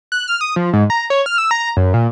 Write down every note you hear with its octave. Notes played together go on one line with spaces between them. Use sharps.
F#6
F6
D#6
F3
G#2
A#5
C#5
F6
E6
A#5
F#2
A#2